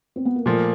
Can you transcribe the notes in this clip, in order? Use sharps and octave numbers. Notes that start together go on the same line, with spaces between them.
C4
B3
A#3
A#2 F3 A3 A#3